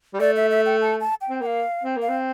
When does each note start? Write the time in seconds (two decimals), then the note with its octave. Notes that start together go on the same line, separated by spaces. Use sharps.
0.14 G3
0.20 A3 D5
0.36 E5
0.50 E5
0.66 G5
0.81 A5
1.00 A5
1.21 G5
1.29 C4
1.41 A#3 G5
1.46 F5
1.83 C4
1.96 A#3
2.02 F5
2.09 C4